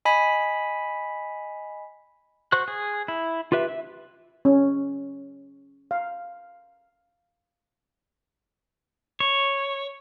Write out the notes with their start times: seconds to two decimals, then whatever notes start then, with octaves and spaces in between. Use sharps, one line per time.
0.05 D#5 G#5 B5 B6
2.52 F#4 C5 C#6 F#6
2.68 G#4
3.08 E4
3.52 F4 G4 B4 E5
3.68 E5
4.45 C#4
5.91 F5
9.20 C#5